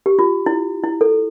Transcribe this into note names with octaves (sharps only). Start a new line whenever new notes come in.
G4
F4
E4
E4
A4